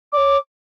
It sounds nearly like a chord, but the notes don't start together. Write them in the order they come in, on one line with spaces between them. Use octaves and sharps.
D5 D6 C#5